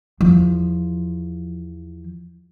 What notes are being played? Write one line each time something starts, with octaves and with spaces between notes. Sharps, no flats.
E2 F3